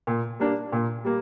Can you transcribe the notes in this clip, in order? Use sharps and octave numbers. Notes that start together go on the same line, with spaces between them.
A#2
G3 A#3 D4
A#2
G3 A#3